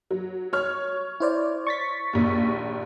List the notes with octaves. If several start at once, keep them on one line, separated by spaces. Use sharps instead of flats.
F#3
C#5 F6
E4 C5 D5
C#6 A6 B6
A#1 D#2